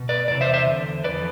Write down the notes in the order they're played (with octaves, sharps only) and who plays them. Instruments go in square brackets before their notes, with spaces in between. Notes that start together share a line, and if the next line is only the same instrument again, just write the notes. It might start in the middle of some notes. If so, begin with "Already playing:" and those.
Already playing: [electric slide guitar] B2
B4 D5
E2 C3 E3 D5
C5 E5
C5 E5
E2 D3
F2 E3 B4 D5